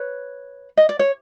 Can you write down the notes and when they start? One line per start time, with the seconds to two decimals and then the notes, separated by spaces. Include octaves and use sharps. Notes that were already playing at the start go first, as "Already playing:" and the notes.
Already playing: B4 C#5
0.77 D#5
0.89 D5
0.99 C#5